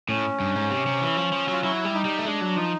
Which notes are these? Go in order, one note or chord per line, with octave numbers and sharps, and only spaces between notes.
A2 C#4
G2
G#2
C3
C3
E3
F3
F3
F#3 F4
F#3 E4
G3
D#4
G3
A3
G#3 D4
F#3
F3 D#4